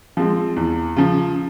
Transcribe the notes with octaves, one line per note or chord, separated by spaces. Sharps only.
F3 G#3 C4
E2
C#3 F3